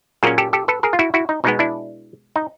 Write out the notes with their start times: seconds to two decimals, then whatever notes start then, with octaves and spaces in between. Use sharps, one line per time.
0.23 A#2 F#3 A#3 C#4 F#4 G#4
0.38 G4 A4
0.53 G4 A4
0.68 A4 B4
0.83 G#4 A#4
0.93 F4
0.99 E4 F#4
1.14 E4 F#4
1.29 D#4
1.44 B2 G#3 B3 D#4
1.59 D4 E4
2.36 D#4